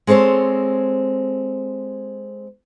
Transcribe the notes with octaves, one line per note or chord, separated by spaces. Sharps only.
G#3 C4 A4 C5 C#5